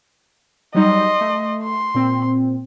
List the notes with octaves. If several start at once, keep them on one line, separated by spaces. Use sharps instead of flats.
F#3 G3 D#4 D#5 C6
A3
C6
A#2 C4